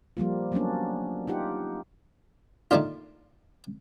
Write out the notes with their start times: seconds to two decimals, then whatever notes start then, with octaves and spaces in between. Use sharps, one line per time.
0.17 F3 G3 A#3 F4
0.52 F#3 A#3 B3 C#4 D4
1.27 D#4 F4 G4 F#5
2.71 D#3 A3 A#3 D4 F4